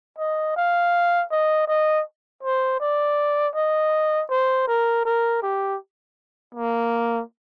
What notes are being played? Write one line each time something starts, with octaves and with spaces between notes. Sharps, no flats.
D#5
F5
D#5
D#5
C5
D5
D#5
C5
A#4
A#4
G4
A#3